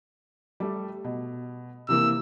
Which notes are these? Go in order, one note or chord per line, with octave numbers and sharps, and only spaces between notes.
G3 A3
B2
C3 E3 A#3 E6